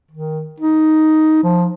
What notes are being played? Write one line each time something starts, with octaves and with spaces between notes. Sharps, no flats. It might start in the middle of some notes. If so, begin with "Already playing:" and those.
D#3
D#4
F3